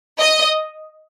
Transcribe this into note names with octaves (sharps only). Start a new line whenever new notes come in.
D#5